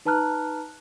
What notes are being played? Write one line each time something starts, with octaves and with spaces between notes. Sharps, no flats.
D#4 B4 A5 A#5 F6 F#6